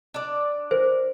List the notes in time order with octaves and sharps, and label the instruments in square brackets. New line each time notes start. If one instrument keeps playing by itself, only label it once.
[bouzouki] D4 D5
[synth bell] A#4 [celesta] C5